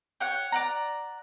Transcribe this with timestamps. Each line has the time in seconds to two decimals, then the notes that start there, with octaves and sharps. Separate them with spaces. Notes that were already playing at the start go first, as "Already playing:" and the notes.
0.20 C#5 F#5 G5
0.52 D5 F#5 A#5